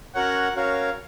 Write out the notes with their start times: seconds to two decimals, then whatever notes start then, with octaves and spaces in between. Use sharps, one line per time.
0.15 C#4 F#4 A#4 C#5 F#5
0.56 C#4 F#4 A#4 C#5 F5